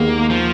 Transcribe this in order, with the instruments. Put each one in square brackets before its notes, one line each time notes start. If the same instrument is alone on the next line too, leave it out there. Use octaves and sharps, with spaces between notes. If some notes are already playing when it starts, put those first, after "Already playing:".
Already playing: [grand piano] D#2 D#3 G#3 B3 [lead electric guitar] A#3
[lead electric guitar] F3